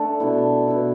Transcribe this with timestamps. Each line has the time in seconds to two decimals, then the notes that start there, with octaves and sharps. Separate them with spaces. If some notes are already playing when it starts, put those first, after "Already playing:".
Already playing: A3 D4 A4
0.20 B2 B3 E4
0.68 B2 B3 E4